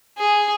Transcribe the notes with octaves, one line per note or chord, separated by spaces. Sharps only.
G#4